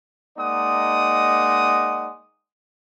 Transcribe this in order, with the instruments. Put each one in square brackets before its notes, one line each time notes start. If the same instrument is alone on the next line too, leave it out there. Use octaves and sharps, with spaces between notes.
[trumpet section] G#3 A#3 D#4 D5 F#5 D#6